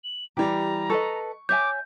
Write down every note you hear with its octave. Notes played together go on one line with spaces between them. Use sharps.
F#7
E3 G3 G4 A#5
A4 B4 D#5 C#6
C#5 E5 G#5 D6 G6